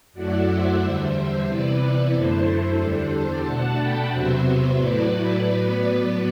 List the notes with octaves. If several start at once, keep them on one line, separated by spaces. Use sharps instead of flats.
F#2 F#3 A3 E4 D5 F#5
C5 E5
E2 D3 G3
C3 E3 B3 E4 B4 D5
B4 D5
F#2 D3 A3 E4 A4 C5
E2 D3 G3 D4 A4 C5
A4 C5
B2 A3 D4 F#5 A5
G5 B5
E2 C3 F#3 B3 C5 E5
A2 F#3 A3 E4 B4 D5
A2 F#3 B3